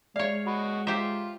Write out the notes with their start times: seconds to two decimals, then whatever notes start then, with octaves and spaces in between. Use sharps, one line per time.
0.16 G#3 C#5 D5 E5 F5 D6
0.47 F#4 D#5 B5 C#6
0.87 F4 G4 C5 E5 A#5